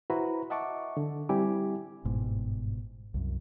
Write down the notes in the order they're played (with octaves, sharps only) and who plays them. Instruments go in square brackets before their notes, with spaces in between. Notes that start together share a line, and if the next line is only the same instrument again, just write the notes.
[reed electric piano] E4 F#4 B4 C5 A#5 B5
D#5 E5 F#5 A5 C#6 D6
D3
G3 C4 E4 G4 G#5 D6
[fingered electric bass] G1 G#2 B2
C2 F#2